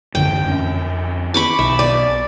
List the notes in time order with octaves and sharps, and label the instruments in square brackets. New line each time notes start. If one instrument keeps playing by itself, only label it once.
[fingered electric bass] A1 F#2 D3 [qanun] G5
[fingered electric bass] F2 C4 C#4
[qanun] B5 C#6 D6
[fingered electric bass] B1 [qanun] E5
[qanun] D5